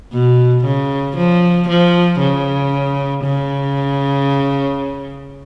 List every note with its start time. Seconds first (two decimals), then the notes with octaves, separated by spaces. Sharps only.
0.13 B2
0.65 C#3
1.16 F3
1.69 F3
2.20 C#3
3.24 C#3